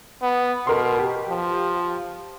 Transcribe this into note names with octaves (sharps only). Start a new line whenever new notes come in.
B3
B2 A#4 C6
G4
F3